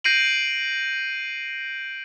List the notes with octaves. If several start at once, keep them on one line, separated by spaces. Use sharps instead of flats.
G6 A#6 C7 D7 D#7 F#7